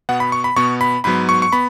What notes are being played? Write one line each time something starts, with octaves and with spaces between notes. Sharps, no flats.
B2 B3 F#5
B5
C#6
B5
B2 B3 C#6
B5
G#2 F#3 B3 B5
C#6
C#6
B3 B5